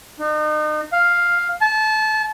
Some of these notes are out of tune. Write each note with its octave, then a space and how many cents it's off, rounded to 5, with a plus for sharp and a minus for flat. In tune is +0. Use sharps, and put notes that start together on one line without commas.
D#4 -35
F5 +5
A5 -25